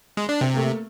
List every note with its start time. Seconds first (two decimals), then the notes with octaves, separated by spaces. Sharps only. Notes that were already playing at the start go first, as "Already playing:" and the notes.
0.17 G#3
0.29 D4
0.41 C3 C4
0.54 A3 A#3